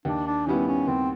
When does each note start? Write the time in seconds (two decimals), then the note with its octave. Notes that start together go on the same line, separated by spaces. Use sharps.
0.05 D#2 D4
0.27 D4
0.47 D#3 G3 B3 C#4 E4
0.67 C#4
0.88 D#2 C4